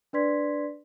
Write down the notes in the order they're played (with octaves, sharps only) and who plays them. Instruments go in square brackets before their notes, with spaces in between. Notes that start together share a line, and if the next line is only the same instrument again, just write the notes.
[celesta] D4 B4 D5 C6 G#6 B6